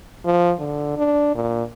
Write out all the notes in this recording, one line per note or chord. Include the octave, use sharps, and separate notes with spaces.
F3
D3
D4
A#2